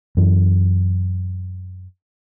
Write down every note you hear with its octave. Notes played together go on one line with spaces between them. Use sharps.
F#2 E3